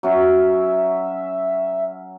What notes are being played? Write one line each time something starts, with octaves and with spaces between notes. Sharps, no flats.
F#3 C#4 E5